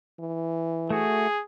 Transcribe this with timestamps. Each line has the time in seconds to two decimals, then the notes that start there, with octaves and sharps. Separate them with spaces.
0.20 E3
0.90 A3 F#4 G#4